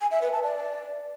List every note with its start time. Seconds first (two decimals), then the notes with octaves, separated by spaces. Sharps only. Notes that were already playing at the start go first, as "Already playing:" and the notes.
0.01 G#5
0.11 E5
0.22 B4
0.32 A5
0.43 D5